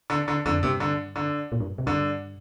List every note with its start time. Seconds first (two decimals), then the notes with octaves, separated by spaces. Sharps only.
0.10 D3
0.28 D3
0.46 F2 D3
0.63 G2 C3
0.80 D3
1.16 D3
1.52 A#2
1.60 G2
1.78 C3
1.86 G2 D3